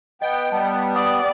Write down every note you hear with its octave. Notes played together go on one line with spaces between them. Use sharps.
B3 D#5 G5
G3 B3 A5
D5 F#5 D6 D#6